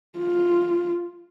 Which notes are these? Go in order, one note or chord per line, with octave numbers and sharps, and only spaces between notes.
F4